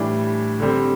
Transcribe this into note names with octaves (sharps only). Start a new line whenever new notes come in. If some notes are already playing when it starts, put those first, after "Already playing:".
Already playing: A2 E3 G3 D4
D3 G3 C4